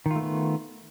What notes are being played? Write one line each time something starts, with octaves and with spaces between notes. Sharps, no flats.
D#3 A3 B3 F4